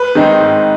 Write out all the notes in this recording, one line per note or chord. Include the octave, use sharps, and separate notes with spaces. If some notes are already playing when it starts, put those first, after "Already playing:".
Already playing: B4
D#3 G#3 C4 D#4
G#2